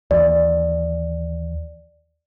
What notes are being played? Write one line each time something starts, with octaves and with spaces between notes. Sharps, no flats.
D#2 E3 D5